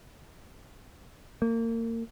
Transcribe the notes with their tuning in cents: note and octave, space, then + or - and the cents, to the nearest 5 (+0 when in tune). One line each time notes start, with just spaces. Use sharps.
A#3 -30